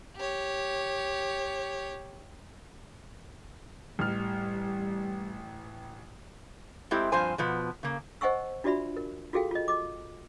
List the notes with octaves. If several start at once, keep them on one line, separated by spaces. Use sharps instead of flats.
G4 C#5
A1 G3 F6
G#3 A3 C4 E4 G4
G2 F3 C4 C5 G#5
B2 F3 B3
C#3 A#3
C5 D#5 F#5 G#5 C#6 E6
D4 F4 F#4 D5 E5 B5
A#4
F4 F#4 G#4 A4 F5 G5
F4 D#5
D#5 D6